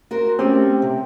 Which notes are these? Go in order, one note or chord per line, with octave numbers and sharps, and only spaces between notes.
F#4 A#4 C5
A3 C4 C#4 G4
C3